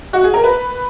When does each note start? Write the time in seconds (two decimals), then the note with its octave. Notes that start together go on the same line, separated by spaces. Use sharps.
0.13 F#4
0.24 G#4
0.34 A#4
0.44 B4